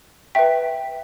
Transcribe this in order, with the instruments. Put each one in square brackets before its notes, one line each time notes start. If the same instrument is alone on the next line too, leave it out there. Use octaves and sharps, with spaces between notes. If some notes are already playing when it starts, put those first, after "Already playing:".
[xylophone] B4 E5 G5 B6